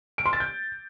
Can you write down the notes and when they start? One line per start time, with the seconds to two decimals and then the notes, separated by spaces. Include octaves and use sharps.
0.18 D7
0.26 C6
0.33 A6
0.40 G6